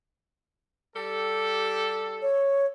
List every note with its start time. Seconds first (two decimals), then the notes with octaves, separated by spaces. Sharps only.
0.95 G3 G4 A4
2.22 C#5